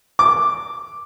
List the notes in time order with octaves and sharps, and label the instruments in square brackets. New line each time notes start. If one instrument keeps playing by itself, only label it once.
[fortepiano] D6